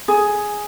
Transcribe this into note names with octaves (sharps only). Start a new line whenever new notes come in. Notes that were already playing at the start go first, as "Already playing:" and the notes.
G#4